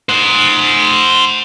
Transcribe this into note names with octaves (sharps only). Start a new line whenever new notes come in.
C5 F#5